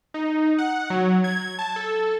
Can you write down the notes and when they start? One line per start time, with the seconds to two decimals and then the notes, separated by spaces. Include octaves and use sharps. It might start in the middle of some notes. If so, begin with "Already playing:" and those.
0.14 D#4
0.58 F#5
0.90 F#3
1.24 G#6
1.59 A5
1.76 A4